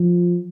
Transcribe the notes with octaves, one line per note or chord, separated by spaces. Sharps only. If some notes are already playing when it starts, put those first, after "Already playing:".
Already playing: F3